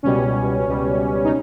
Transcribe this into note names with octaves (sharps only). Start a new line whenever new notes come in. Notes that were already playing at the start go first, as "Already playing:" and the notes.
C#2 B2 G3 C#4
C#2 B2 G3
D#4